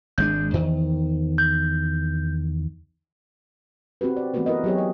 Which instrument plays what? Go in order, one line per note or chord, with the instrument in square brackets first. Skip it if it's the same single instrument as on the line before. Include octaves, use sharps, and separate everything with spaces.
[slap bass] G#1 G#3 D4 [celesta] G6
[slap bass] E2 D#3 [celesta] C5
[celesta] G6
[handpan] C4 F#4 G4 B4
D5
E3 A3 B3 C4 F#4 B4
E4 A#4 B4 D#5
F#3 B3 G4 G#4 C#5
D#5